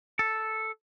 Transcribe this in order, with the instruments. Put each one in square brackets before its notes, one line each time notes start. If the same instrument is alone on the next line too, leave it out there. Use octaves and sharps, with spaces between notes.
[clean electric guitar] A4